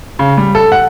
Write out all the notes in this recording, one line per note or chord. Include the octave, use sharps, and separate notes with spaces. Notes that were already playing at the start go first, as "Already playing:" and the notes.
C#3
G3
A4
F#5